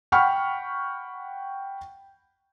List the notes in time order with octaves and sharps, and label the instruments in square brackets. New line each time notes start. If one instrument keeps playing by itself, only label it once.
[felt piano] F#5 G5 B5 C#6 F6